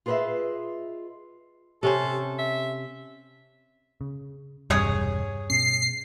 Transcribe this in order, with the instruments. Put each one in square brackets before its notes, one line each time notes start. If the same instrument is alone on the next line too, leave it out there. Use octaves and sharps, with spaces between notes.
[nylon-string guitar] F4 G#4 B4 C#5 D#5 E5
[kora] C3 C#4 C5 [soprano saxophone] A4
[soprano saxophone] E5
[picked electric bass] C#3
[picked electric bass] E1 C2 C3 [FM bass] G2 [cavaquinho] G#4 C#5 D#6
[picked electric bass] B2 C#4 [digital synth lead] C7